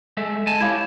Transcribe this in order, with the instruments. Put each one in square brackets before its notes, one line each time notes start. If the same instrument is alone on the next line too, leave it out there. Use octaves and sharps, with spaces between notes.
[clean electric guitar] G#3 A4 E5
G#3 G#5 A5
[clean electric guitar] E4 G4 C#5 [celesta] F5 G#6